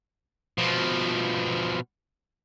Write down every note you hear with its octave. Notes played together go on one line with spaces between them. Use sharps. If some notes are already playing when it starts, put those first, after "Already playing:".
B2 F3